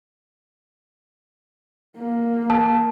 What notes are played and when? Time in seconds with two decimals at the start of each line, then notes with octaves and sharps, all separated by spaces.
1.98 A#3
2.50 A5